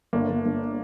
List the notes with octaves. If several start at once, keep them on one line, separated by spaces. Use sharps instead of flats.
G1 A#3 D4
G1
G1